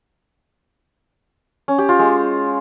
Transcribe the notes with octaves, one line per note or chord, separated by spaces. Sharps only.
C#4
G4
F4
G#3